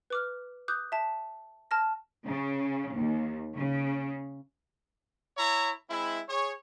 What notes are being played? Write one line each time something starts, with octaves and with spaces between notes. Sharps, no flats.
B4 D6 F6
D6 D#6 F#6 G6
E5 A5
A5 F6 A#6
C#3
D#2
C#3
E4 C#5 E5 A#5
G#3 C4 E4
G#4 C#5